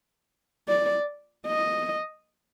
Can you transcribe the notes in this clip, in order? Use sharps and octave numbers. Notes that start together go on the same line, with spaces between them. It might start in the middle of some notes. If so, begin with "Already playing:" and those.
D5
D#5